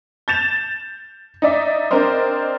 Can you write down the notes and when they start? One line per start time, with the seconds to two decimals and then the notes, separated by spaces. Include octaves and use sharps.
0.28 G6 A6 E7 F7
1.42 D#4 D5 E5
1.90 C4 D4 A#4 C5 D#5